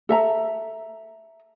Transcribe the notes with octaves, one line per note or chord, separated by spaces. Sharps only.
A4 E5 A#5